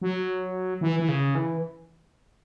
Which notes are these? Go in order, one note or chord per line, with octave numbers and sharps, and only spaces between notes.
F#3
E3
E3
C#3
E3